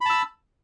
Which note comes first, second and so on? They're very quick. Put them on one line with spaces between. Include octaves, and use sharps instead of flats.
B5 A5 E6